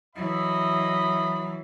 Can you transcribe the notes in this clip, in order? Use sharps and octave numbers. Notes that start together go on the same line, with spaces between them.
E3 F#3 D#5 E5 B5